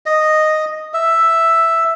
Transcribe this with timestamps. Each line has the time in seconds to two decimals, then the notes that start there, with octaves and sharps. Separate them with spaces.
0.06 D#5
0.94 E5